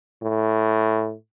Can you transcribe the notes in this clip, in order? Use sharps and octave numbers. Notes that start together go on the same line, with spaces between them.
A2